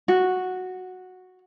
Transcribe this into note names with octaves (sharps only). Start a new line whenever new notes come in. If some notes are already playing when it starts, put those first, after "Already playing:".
F#4